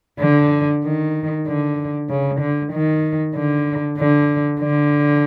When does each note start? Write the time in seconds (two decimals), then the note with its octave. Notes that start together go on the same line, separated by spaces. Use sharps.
0.20 D3
0.83 D#3
1.45 D3
2.09 C#3
2.40 D3
2.72 D#3
3.34 D3
3.98 D3
4.60 D3